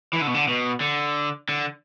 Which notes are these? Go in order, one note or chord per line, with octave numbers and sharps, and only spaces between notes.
E3
D3
B2
D3
B2
D3
D3